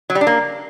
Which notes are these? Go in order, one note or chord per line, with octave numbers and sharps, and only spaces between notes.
F#3
G3
D4
A#3